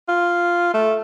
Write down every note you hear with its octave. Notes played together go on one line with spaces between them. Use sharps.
F4
A3